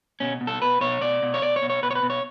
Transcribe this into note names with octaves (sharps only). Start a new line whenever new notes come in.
B2 C#4
B2
A4
B2 B4
B2 C#5
B2 D5
B2
C#5
B2 D5
C#5
B2
C#5
B2 B4
C#5
B4
B2
C#5